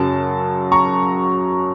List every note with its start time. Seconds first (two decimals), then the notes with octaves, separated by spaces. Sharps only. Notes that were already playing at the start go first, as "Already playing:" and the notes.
Already playing: F#2 C#3 F#3 A5
0.72 A#5 C#6